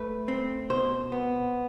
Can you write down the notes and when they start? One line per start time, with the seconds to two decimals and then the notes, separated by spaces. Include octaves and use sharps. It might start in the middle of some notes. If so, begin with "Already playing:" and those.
Already playing: A3 B4
0.28 C4
0.70 B2 C5
1.12 B3